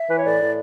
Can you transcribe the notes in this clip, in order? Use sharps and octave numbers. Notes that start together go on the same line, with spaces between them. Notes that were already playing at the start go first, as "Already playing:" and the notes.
Already playing: E5
E3 B4
C#5
A2 D5
A2